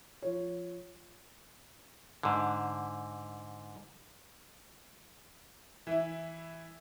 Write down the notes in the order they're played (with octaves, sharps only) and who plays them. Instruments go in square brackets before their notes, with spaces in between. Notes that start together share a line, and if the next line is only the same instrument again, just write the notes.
[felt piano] F3 C#5
[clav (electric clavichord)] G#2 D3
[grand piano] E3 E4